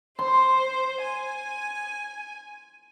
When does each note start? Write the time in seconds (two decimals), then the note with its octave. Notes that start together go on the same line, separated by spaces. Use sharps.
0.19 C5 C6
1.02 G#5